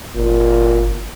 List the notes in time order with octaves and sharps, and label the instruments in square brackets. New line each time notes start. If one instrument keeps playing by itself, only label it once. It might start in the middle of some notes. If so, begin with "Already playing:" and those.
[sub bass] G1 [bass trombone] A#2